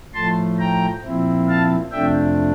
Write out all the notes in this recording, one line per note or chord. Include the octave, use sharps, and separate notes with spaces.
A2 F3 A3 A5 C6
G5 A#5
A#2 F3 C4 E4
F5 A5
F2 C3 F3 A3 D4 E5 G5